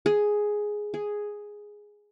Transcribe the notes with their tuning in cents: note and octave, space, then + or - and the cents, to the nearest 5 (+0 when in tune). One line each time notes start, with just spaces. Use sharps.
G#4 +5
G#4 +0